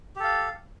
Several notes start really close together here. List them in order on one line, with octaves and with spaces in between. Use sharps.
G4 A4 F5